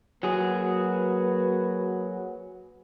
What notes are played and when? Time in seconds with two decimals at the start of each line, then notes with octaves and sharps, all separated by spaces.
0.23 F#3 A#3 F#4 G#4 B4